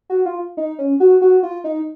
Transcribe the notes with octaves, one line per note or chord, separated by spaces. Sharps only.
F#4
F4
D#4
C#4
F#4
F#4
F4
D#4